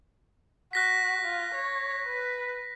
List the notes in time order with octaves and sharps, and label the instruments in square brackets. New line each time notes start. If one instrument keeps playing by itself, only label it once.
[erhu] F#4 [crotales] F#6 A#6 B6
[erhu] F4
C#5
B4